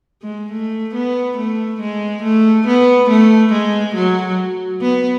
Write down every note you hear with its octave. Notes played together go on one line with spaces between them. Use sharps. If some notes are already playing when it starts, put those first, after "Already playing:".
G#3
A3
B3
A3
G#3
A3
B3
A3
G#3
F#3
B3